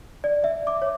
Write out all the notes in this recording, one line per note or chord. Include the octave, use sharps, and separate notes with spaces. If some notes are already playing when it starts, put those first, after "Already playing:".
D5
E5
D6
C#5